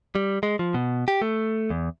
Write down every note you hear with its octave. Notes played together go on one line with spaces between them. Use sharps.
G3
G#3
F3
B2
G4
A3
E2